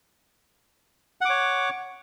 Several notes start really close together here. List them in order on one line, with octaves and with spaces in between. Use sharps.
F#5 D6 C#5